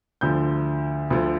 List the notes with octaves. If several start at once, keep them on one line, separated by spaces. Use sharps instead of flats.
D2 D3 F3 G6
D2 D3 F3